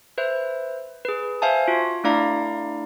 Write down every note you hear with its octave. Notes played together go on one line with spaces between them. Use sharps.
B4 C5 E5
G#4 B4
C5 E5 F5 G#5 A5
F4 F#4
A3 D4 E4 D5 F5 A#5